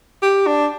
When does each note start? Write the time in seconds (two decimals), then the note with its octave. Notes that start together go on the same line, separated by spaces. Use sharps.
0.22 G4
0.47 D4